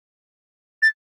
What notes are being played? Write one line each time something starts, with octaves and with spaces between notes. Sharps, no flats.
A6